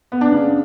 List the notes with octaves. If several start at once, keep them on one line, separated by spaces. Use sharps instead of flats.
B3
D4
C#3